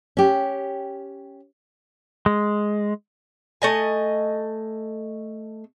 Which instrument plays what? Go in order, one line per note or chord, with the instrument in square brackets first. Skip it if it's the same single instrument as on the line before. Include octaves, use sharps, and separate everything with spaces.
[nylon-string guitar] C#4 G4
[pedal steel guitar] G#3
[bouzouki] A3 D#5 G#5